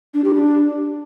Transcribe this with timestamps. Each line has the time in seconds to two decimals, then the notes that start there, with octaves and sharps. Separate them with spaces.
0.14 D4
0.24 G4
0.34 D4